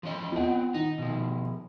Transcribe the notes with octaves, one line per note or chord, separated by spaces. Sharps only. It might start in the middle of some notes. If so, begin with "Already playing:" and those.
F3 C#4 D#5
B3 C4 F4 F#5
D#3 D#4
B2 F3